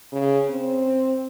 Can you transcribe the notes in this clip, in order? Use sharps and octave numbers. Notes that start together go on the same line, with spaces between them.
C#3
C4